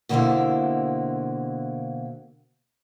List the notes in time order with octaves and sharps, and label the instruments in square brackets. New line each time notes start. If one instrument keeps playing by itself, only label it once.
[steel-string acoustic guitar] B2 D3 A#3 E4 C5 E5